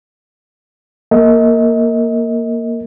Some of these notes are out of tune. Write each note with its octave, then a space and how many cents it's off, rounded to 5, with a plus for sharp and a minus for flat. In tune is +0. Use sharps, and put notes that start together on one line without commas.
A#3 +0 A#4 -20 D#5 +35